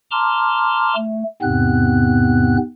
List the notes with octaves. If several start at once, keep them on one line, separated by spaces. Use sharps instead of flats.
A5 A#5 C6 D6 F6
A3
E2 G#2 C3 B3 C4 F#6